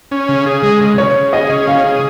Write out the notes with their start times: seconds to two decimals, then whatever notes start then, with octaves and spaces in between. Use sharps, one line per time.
0.11 C#4
0.29 C#3
0.46 G#4
0.63 G#3
0.80 C#3
0.98 C#3 C#5
1.16 C#3
1.33 G#4 D#5
1.50 C#4
1.67 C#3 F5
1.84 G#4